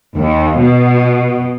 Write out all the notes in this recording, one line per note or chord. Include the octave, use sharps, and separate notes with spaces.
D#2
B2